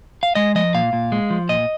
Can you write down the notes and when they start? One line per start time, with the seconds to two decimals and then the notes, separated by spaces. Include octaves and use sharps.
0.23 F5
0.35 G#3 D#5
0.55 F3 D#5
0.74 A#2 F5
0.93 A#2
1.12 G#3
1.30 F3
1.49 A#2 D#5